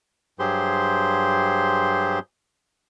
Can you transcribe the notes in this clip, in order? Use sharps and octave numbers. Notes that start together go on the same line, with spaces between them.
G2 F#3 G4 G#4 C5 C6